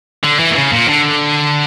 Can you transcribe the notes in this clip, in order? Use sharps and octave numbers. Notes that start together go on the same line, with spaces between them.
D3
E3
A#2
C#3
A#2
D3